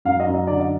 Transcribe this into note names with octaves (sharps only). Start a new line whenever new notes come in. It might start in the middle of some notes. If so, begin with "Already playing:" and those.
F#2 F5
D#5
F#2
D#5
D3 D5
D#5